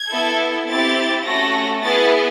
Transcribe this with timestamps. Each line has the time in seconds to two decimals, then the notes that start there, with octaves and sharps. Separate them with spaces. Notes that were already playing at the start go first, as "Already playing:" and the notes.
Already playing: G#6
0.10 B3 E4 A4
0.68 C4 E4 G4 A6
1.25 A3 C#4 F#4 A4 A#6
1.83 B3 E4 G#4 A6